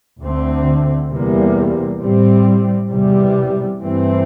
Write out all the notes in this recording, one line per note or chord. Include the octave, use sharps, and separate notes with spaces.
D2 D3 A3 C4
E2 C3 G3 A#3
A2 G3 C4
E2 C3 G3
G2 E3 A3 C4